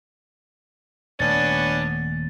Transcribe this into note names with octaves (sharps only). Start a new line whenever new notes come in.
D#1 A3 B3 C#4 D4 A6